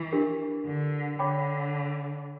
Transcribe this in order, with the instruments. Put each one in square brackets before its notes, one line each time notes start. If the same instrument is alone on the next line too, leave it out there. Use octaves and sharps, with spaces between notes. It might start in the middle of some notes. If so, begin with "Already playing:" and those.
Already playing: [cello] E3
[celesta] D4 G4 A#4
[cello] D3
[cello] D3 [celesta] C#5 G5 B5 D6